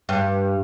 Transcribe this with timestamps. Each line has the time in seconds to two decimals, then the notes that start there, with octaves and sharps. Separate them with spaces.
0.09 G2